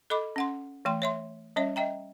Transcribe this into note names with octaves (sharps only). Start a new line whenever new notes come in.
A4 D#5 B5 D6
C#4 F#5 C6
E3 A3 G5 C6
C#5 E5 C6
G3 C#4 C#5 E5
D#5 E5 G5 A#5